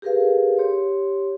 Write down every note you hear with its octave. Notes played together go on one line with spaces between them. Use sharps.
G4 G#4 A#4 B4 F5
G4 C#5 C6